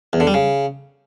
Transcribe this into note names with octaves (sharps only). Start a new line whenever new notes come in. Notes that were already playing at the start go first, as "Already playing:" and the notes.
E2
D3
G3
C#3